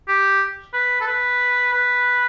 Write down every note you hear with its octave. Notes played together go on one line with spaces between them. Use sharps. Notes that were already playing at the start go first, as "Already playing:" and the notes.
G4
B4
A4
B4
B4